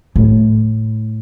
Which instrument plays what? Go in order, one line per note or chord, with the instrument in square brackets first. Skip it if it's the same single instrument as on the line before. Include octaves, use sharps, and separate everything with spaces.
[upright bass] A2